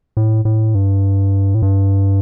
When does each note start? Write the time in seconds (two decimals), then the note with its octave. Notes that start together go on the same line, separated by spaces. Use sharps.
0.17 A2
0.45 A2
0.75 G2
1.54 A2
1.62 G2